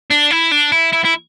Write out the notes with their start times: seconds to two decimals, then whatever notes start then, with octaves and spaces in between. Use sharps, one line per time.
0.10 D4
0.31 E4
0.51 D4
0.72 E4
0.93 E4
1.05 E4